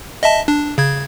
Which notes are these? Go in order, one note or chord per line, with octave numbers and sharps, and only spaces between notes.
D#5 E5 A5
D4
C#3 G#6